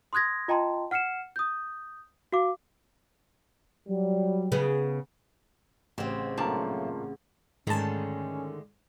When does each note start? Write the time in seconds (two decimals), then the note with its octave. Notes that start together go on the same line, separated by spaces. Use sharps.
0.13 C6 D#6 F#6 G#6 A#6
0.48 F4 D#5 G5 A5 A#5 C6
0.91 F#5 F6 C7 C#7 E7
1.36 D#6 G6
2.32 F#4 F5 D6
3.89 F#3 G3
4.52 C#3 B3 G#4
5.98 A1 C#3 C4
6.37 G2 A#2 F#3 A3 A#3 A5
7.67 G#2 D3 D#3 G#3 A3 C#4 A5